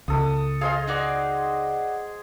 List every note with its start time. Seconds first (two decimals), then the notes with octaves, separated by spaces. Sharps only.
0.08 C#2 A4 D#6
0.61 G#4 C5 D#5 F5
0.88 D#4 F#4 D5